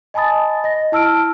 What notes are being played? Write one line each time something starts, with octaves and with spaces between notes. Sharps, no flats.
D#5 G#5 A5 B5 D#6 A6
D#5 A#6
E4 A5 E6 F6 D7